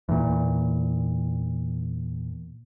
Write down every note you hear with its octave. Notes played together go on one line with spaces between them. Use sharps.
E2 A#2